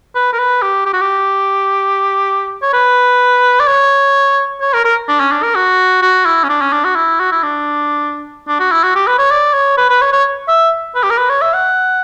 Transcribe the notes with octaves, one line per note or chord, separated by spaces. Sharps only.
B4
A#4
B4
G4
G4
F#4
G4
C#5
B4
D5
C#5
C#5
A#4
A#4
D4
C#4
D4
A#4
F#4
F#4
E4
C#4
D4
C#4
D4
F#4
E4
F#4
E4
D4
D4
F#4
E4
F#4
G4
B4
C#5
D5
C#5
B4
B4
C#5
C#5
E5
B4
G4
A#4
B4
C#5
E5
F#5